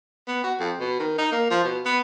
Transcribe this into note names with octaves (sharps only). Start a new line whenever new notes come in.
B3
F#4
F2
B2
D#3
D#4
A#3
F3
B2
B3